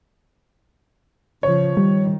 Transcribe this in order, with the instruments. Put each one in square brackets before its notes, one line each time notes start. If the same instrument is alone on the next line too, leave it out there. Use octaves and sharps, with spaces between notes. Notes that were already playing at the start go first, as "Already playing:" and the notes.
[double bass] C#3 F3 [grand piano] C#5
[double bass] D#3 [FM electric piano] G3